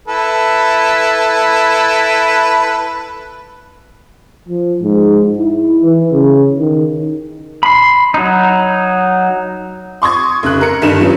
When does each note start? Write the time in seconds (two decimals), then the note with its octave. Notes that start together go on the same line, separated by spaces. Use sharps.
0.08 E4 A4 B4
4.49 F3
4.83 G#2
5.38 E4
5.84 E3
6.13 C#3
6.59 D#3
7.63 B5 C6
8.14 F#3 D#4
10.02 C6 C#6 D#6 G#6
10.43 F1 C#3 F#6
10.61 A#4 C#7
10.82 G1 G2 D#3 D#4 E7
11.00 F3 F#3 B3 C#4